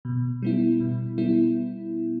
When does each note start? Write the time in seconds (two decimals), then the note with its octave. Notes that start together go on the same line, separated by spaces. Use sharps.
0.05 B2
0.42 G3 B3 E4
0.80 B2
1.18 G3 B3 E4